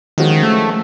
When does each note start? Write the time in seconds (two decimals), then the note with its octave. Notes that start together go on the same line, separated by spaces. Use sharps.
0.18 D#3 F3 G#3 C#4 F#4
0.43 A3